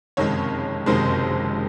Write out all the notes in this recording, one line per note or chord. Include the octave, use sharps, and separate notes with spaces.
F#1 F2 C3 D#3 G#3 C#5
F#1 F2 C3 D#3 G#3 C5